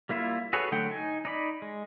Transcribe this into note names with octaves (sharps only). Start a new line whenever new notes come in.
G3 A#3 E4 F4 E5
F#4 G#4 A4 B4 C#5
D3 F#3 A3 F#5 G5
D#4 G#5
D#4 D5 B5
G#3